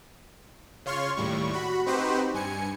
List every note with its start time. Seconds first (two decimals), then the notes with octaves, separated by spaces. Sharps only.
0.86 C#3 F4 C#5 C6 C#6 F6
1.17 D#2 A2 G3 C#6
1.53 F#4 B5
1.86 C4 D#4 F#4 G4 B4 C5
2.34 G2 G#5 C#7